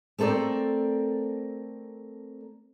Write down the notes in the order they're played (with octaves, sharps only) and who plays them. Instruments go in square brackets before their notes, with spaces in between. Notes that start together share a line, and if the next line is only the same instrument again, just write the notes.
[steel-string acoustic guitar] A3 C4 A4 A#4 D5